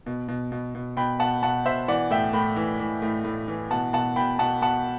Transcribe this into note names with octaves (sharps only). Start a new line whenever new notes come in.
B2
B2
B2
B2
B2 G5 B5
B2 F#5 A5
B2 F#5 A5
B2 C5 E5
E3 D5 F#5
A2 E5 G5
A2 G5 B5
E3
E3
A2
A2
E3
B2 F#5 A5
B2 F#5 A5
B2 G5 B5
B2 F#5 A5
B2 F#5 A5